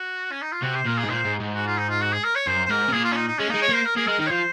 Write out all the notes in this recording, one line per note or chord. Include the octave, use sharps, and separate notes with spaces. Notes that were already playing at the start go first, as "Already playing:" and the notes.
Already playing: F#4
C#4
D#4
F4
C3 F#4
C5
A#2 A#4
G#4
G#2
A#2 C5
G#2
G#2
F#4
F4
D#4
F4
F#4
G#4
A#4
C#5
F#2 C5
C5
G#2 A#4
C3
A#2 G#4
F4
C#4
D#4
D#4
G#3 C#4
G#3 A#3 D#4
C#5
A#3 C5
A#4
A#3 G#4
G#3 A#4
D#3 A#4
C#5
F3 C5